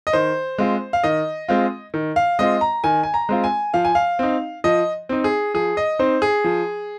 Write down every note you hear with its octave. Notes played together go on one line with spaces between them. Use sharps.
D#5
D#3 C5
G#3 C4 F4
F5
D#3 D#5
G#3 C4 F4
D#3
F5
G#3 C4 F4 D#5
A#5
D#3 G#5
G#5
A#5
G#3 C4 F4
G#5
F3 F5
G#5
F5
C4 D#4
F3 D#5
C4 D#4
G#4
F3 G#4
D#5
C4 D#4 C5
G#4
F3